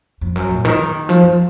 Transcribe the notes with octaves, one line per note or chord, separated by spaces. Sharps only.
F2
F#2
A#2
D#3
F3
F#2